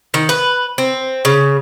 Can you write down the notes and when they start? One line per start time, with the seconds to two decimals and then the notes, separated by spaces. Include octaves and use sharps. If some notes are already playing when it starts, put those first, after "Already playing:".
0.14 D#3
0.29 B4
0.78 C4
1.25 C#3